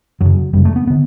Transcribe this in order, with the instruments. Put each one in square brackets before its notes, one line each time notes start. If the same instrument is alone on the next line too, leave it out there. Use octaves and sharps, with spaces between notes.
[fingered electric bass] F#2 C#3 F#3
F#2 C#3 G3
A3
B3
D3 B3